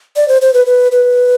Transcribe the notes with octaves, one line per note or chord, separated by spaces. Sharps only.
D5
C5
C5
B4
B4
B4